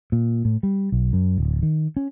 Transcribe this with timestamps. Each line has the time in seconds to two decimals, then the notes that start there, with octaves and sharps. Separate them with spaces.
0.12 A#2
0.45 A2
0.63 G3
0.92 B1
1.13 F#2
1.38 D1
1.63 D#3
1.96 C#4